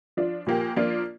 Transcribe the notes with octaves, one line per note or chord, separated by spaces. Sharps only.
F3 D4 F4
A#2 F3 A#3 G4
F3 A#3 D4 F4